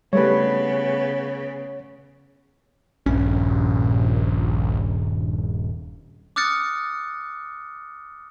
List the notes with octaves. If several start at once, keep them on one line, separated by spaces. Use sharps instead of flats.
C#3 G3 A3 B3 B4 C#5
D#1 A#1 G2 C#4
D6 D#6 F6 F#6 A6 C#7